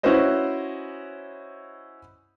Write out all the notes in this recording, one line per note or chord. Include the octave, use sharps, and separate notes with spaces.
C#4 E4 F#4 B4 C5 D#5